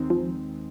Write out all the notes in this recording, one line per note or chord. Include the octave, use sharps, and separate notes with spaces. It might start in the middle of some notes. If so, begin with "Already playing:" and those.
Already playing: D#2 D#3 G#3 C4 D#4
F3